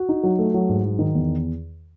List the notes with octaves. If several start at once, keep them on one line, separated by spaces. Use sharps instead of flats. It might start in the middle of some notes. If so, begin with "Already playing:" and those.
Already playing: F#4
D#4
F#3
A3
F#3
G#2
F#3
D#3
E2